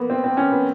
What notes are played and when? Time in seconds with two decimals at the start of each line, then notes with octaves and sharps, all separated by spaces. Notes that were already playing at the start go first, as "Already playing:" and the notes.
Already playing: A#3 B3
0.10 C4
0.24 C4
0.37 C#4
0.51 B3